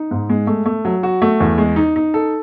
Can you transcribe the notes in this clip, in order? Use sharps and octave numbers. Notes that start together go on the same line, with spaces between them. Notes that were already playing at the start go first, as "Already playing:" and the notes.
Already playing: D#4
G#2
G#3
A3
A3
F#3
F#4
A3
E2
G#3
D#4
D#4
A4